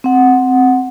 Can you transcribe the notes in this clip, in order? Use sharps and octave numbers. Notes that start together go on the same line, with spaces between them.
C4 F#5